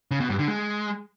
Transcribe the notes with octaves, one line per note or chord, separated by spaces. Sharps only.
C#3
B2
G2
D3
G#3